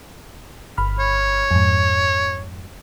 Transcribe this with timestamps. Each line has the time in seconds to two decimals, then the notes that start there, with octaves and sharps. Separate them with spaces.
0.78 G1 B5 F6
0.99 C#5
1.51 F2 G#2